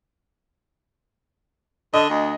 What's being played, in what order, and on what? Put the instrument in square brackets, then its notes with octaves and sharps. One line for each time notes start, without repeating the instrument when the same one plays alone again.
[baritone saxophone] D3 [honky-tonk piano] D#5
[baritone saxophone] D2